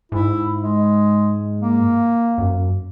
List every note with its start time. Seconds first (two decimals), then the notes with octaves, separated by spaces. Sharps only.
0.12 G#2 E4
0.62 G#3
1.60 A#3
2.38 F#2